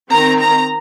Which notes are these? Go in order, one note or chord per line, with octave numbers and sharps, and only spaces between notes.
D#3 C4 A#5
A#5